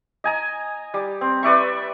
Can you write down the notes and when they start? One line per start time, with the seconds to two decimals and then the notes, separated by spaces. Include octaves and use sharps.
0.24 D#5 G#5 A#5
0.94 G3
1.21 C4
1.43 B4 D5 E5 C#6